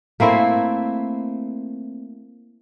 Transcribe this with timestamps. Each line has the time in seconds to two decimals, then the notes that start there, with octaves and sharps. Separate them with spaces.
0.20 A3 A#3 C4 E4